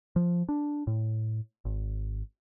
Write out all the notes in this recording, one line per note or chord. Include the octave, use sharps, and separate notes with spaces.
F3
D4
A2
G#1